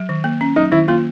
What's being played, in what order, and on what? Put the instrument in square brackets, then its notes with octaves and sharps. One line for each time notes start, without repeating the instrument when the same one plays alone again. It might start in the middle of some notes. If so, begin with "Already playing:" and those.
Already playing: [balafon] F#3
D#3
A#3
C#4
[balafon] F#3 [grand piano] D#4
[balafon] D#3 [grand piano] E4
[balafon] A#3 [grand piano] F4